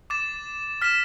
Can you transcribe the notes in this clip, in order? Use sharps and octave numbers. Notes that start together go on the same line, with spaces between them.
D6 A6 E7
F6 B6 E7